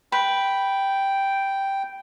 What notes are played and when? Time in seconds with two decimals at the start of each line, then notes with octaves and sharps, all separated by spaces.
0.12 B4 G5